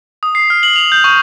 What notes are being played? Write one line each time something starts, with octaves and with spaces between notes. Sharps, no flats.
D#6
C7
F6
F#7
F7
G6
C#6